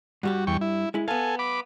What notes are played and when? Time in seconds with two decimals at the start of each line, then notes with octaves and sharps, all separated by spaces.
0.23 G2 G3 F#4 G4
0.47 E2 G5 C#6
0.61 E4
0.94 G#3 E4
1.08 B3 A4 F5 G#5
1.39 B5 D6